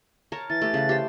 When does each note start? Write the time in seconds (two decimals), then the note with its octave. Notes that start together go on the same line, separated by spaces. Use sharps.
0.32 A#4 C#5 A5
0.50 E3 A6
0.61 A3 G4
0.74 C#3 B4
0.89 G4 C5